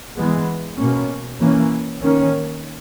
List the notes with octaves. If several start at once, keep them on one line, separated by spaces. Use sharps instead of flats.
E3 G#3 B3
B2 A#3 C#4
E3 A#3 C#4
D#3 A#3 C#4